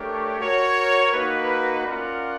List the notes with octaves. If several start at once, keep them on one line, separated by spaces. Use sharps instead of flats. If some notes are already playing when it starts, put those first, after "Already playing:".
Already playing: A3 D4 G4 A#4 C#5
F#4 A#4 C#5
A#3 D#4 F#4 B4
C#4 F4 A#4 D5 F#5